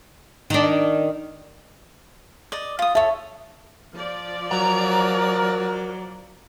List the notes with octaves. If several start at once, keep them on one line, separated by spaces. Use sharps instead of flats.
D#3 D4
D5 D#5
F4 D#6
A4 C#5 E5
F3 D5
F#3 A#4 A#5